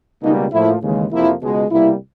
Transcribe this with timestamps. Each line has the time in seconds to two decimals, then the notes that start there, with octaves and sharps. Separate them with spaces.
0.23 C#2 B2 G3 A#3 D#4
0.52 A2 F3 A#3 E4
0.82 D#2 C#3 E3 G#3
1.11 F2 C3 F3 A#3 E4
1.41 C#2 B2 G#3
1.70 C2 B2 G3 A#3 E4